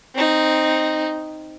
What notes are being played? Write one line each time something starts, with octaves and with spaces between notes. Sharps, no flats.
C4 D#4